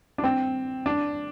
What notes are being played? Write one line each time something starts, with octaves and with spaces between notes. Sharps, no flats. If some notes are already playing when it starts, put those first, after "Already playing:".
D4
C4
D4